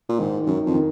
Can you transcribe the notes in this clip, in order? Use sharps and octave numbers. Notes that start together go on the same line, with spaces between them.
A#2
G#2 D#3
F#2 D#3
F2
D#3